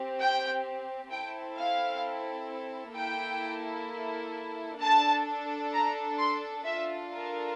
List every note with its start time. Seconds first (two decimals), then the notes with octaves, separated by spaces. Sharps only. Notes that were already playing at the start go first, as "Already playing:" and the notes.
Already playing: C4 G4
0.18 G5
1.11 C4 E4 A4 G5
1.56 F5
2.95 A#3 E4 A4 G5
4.80 D4 A4 A5
5.73 A#5
6.19 C6
6.65 D4 F4 A4 E5
7.11 A#4